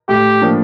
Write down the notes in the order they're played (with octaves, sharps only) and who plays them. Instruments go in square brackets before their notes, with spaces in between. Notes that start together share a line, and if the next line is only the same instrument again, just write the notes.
[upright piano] A2 [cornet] G4
[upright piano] F3 A#3 D4